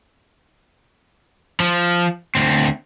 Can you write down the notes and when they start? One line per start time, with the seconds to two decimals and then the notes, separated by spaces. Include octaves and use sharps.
1.60 F3
2.35 D2 C4